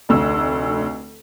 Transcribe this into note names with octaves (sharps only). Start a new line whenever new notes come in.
F1 D2 E6